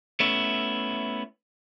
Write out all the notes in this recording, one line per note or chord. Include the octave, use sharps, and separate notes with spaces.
A3 B3 C#4 E4